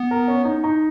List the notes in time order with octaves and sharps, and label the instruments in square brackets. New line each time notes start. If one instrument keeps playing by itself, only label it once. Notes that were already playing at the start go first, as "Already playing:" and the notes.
Already playing: [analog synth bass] B3
[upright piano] A#4
C#4
D#4
D#4